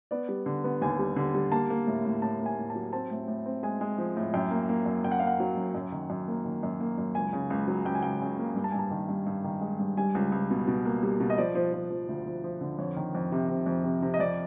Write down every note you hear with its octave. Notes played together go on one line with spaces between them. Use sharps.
B3 D5
G3
D3
B3
D#2 G#5
G3
D3
G3
A#3 A5
A#3
A2
A2
A2 A5
A#3
G#5
A2
A5
F#3
C4 A5
A2
A2
C4
G#3 G#5
G#3
F3
A2
F#2 G5
A#3
A#3
F#2
F#2 G5
F#5
A#3 F5
F#5
F#3
F#2
F#2
D#3
F#2
A#3
D#3
F#2
A#3
F#2
C#2 G#5
C#3
C#2
F#3
C#2 G5
G#5
C#2 G5
C#3
A#3
G2
A5
G#5
G2 A5
D#3
G2
G2
D#3
G#3
G2
G3 G#5
C#2
C#2
B2
B2
A#3
G3
B2
D#5
F3 D5
F3
F3
F3
D2
F3
F3
D3
F2 C#5
D#3
F2
C3
C3
F2
C3
C3
D#5
F2 D5